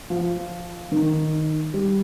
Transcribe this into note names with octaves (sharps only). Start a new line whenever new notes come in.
F3
D#3
G3